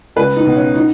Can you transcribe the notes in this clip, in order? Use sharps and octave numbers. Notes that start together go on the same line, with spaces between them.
C#2 B4
D#4
B2
C#4
D#4